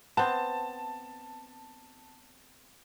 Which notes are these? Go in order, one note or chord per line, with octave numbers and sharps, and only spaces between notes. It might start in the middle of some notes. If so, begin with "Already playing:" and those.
B3 C4 A5